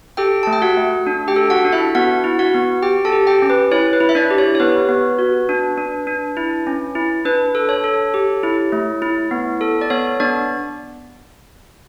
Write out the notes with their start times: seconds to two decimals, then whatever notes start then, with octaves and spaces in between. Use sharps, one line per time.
0.17 G4 A4 G5
0.43 A3 A5
0.53 G5
0.62 F#4 F#5
0.77 A3
1.07 D4
1.28 G4 G5
1.36 A4
1.50 F#4 F#5
1.65 D4
1.72 E4 E5
1.95 B3 F#4 F#5
2.24 E4
2.39 F#4 F#5
2.54 B3
2.83 G4 G5
3.05 A4 A5
3.12 G4
3.27 G4 G5
3.42 C#4
3.50 B4
3.71 E4 C#5
3.93 B4
4.00 E4
4.09 E5
4.15 D4 D5
4.31 G4
4.38 C#5
4.55 C#5
4.60 B3 B4
4.89 B3
5.19 F#4
5.49 D4
5.78 D4
6.07 D4
6.37 E4
6.67 C#4
6.95 E4
7.25 D4 B4
7.55 A4
7.69 C#5
7.84 A4
8.14 G4
8.43 E4
8.72 A3
9.02 E4
9.31 B3
9.61 A4
9.81 D5
9.90 B3 C#5
10.20 B3 D4 D5